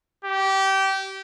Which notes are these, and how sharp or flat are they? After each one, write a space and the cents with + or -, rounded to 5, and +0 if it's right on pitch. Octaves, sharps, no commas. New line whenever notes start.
G4 -20